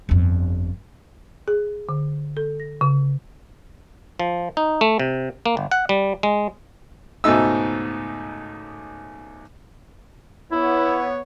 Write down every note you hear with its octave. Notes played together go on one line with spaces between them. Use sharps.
G1 F2
G#4
D3
A4
A#6
C#3
F3
D#4
A3
C3
A#3
G1
F#5
G3
G#3
C#2 G#2 B2 A3 D#4 E6
B3 E4 C#5